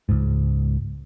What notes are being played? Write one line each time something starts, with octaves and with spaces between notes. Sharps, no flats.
C#2 G#2